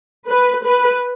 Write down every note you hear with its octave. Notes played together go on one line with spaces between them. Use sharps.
B4
B4